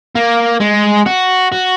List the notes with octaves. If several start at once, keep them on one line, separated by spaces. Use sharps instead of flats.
A#3
G#3
F#4
F#4